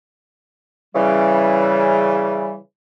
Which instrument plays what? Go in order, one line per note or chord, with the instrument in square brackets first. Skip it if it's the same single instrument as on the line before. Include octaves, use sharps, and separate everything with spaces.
[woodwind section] C#3 E3 G3